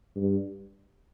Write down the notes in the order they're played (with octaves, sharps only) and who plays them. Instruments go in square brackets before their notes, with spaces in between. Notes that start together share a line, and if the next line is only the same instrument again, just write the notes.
[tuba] G2